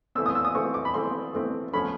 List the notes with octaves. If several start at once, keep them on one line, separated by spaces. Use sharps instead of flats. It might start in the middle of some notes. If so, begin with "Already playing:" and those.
E3 A3 C4 E6
D#6
E6
D#6
E3 A3 C4 C#6
D6
B5
E3 A3 C4 C6
E3 A3 C4
F3 A3 C#4 B5